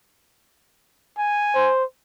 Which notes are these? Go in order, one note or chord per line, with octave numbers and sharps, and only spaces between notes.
G#5
C5